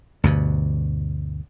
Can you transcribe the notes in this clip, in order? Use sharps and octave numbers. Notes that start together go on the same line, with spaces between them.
D2 G2 B2